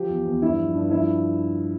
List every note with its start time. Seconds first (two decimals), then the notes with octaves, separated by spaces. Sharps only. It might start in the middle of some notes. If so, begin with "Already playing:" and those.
Already playing: F3 G4
0.09 E2
0.25 E2
0.42 G2 E4
0.58 F3
0.74 G2
0.90 F3 E4